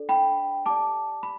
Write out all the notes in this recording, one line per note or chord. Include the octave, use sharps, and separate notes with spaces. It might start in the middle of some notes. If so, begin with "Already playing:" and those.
Already playing: D4 A4 D5
G5 B5
G4 D5 A5 D6
B5